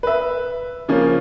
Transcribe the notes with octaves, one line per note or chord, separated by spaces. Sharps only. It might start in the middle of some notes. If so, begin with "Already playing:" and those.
B4 E5
C#3 F3 A#3 C#4